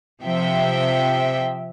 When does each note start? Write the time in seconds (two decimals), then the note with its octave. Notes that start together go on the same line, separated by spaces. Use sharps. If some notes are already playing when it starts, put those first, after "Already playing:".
0.22 C3 F3 E5 G5